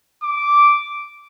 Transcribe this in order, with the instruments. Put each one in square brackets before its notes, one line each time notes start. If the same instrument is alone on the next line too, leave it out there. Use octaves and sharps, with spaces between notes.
[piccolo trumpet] D6